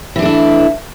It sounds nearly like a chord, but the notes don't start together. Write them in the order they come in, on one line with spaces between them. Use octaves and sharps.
E3 D4 A3 E4